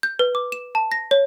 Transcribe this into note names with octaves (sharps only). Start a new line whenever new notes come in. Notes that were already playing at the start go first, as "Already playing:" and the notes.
G6
B4
D6
E7
A5
A#6
C#5